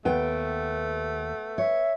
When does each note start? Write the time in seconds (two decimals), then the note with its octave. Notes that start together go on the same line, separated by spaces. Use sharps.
0.05 D#2 A3 B3 G5
1.58 C#5 E5